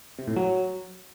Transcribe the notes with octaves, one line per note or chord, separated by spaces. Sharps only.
C3
A2
F#3